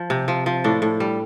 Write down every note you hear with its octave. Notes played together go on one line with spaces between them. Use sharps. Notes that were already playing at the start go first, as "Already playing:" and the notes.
Already playing: F3
C3
F3
F3
A2 D4
A2
G3